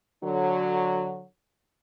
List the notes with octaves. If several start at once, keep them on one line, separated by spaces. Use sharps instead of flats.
D3 F#3